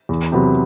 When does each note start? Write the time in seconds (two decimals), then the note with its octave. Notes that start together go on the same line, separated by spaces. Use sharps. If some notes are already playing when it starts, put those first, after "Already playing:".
0.09 E2
0.32 C3 F#3 B3